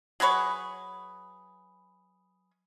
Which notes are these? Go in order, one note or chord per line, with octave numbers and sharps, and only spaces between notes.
F#3 G#4 B4 C#5